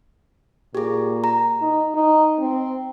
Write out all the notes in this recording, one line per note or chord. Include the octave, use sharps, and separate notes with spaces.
A#2 G4 G#4
A#5
D#4
D#4
C4